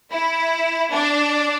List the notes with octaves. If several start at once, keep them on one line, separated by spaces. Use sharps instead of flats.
E4
D4